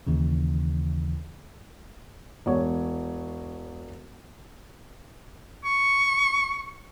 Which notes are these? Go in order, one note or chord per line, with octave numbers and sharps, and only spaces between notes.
D#2 C#3 E3
E1 C#5
C#6